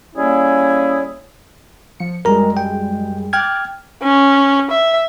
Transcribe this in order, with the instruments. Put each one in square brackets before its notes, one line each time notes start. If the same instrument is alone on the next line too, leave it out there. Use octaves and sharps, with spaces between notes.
[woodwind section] G3 A#3 C#4 E4 G#4 C#5
[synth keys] F3 C#7
[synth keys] F#2 G3 G#3 [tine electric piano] A#4 A#5
[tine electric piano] G5
[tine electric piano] G5 F6 G#6 [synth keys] D6 F#6 A6
[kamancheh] C#4
E5